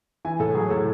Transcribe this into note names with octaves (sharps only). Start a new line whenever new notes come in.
E3 G#5
A2 A4
F#3 G#4
A2 A4